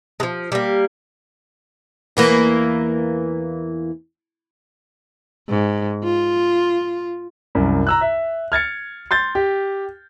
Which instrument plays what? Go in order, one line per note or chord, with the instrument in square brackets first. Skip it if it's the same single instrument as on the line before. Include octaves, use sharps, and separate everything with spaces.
[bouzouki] F3 G#3
G3 A#3
[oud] E2 E3 A#3
[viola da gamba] G#2
F4
[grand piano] C2 F#2
A#5 E6 F#6
E5
F6 G#6 A6 C#7
C6 G6 A6
G4